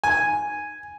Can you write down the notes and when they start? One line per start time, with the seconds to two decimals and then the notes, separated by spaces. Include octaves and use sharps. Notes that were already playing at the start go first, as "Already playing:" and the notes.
0.04 G#5